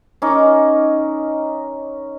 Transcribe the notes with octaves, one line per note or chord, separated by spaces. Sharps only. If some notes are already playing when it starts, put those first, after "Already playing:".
C#4 D#4 A#4 D6